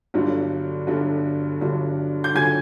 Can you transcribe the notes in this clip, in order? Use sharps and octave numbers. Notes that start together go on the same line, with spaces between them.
G1 G2 D3 F#3
G1 G2 D3 F#3
G1 G2 D3 F#3
G6
D3 F#3 G#5 G#6